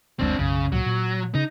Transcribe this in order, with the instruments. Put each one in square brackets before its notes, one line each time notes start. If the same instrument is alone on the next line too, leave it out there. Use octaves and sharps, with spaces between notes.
[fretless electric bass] F#1 D2 G#3 [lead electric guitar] C4 D4
[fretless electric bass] B1 F#2 [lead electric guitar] C#3
[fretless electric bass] C#2 A#2 [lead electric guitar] F#3
[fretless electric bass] A#2
[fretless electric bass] C#3 [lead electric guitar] D#4